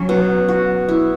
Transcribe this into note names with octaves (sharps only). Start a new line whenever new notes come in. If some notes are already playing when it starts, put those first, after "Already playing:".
Already playing: F#3 C#4
B2
F#4
E4